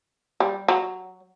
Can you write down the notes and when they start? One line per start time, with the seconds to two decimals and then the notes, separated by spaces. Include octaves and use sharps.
0.40 G3
0.68 F#3